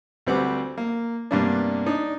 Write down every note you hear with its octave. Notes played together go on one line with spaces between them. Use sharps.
D2 G3 C4 B4 F#5 D6
A#3
G2 C3 A#3 B3 D4
D4 D#4